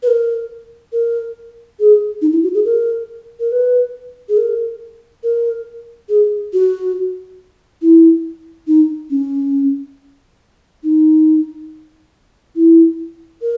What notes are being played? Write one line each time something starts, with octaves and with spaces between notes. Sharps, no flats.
B4
A#4
A#4
G#4
D#4
E4
F#4
G#4
A#4
A#4
B4
G#4
A#4
A#4
G#4
F#4
E4
D#4
C#4
D#4
E4
A#4